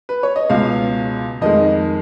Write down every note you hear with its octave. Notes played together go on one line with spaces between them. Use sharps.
B4
C#5
D#5
C#2 B2 G#3 F5
F2 D#3 G#3 D#5